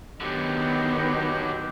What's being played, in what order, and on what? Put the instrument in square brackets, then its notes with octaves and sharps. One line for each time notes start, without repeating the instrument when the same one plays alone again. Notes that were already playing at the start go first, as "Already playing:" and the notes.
[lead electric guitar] D3 F#3 [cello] D#3 B3 [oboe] G4